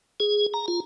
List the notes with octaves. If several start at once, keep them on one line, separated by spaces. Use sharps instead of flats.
G#4
A#5
F4